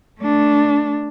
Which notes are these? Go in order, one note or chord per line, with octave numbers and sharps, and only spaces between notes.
A3 D4